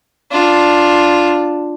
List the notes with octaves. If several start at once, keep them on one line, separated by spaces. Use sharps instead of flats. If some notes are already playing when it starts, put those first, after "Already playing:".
D4 F4